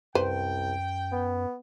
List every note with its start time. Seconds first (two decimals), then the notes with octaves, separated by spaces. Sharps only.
0.15 C2 F#2 B4 C5 G5
1.12 B3